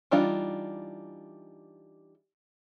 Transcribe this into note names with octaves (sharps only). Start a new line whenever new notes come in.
E3 G3 D4 D#4 F4